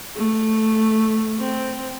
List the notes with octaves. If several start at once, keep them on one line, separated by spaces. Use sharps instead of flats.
A3
C4